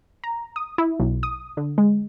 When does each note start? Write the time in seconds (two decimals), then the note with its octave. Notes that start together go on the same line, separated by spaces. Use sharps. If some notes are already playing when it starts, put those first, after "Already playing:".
0.24 A#5
0.56 D#6
0.78 E4
1.00 B1
1.23 D#6
1.57 D3
1.78 G#3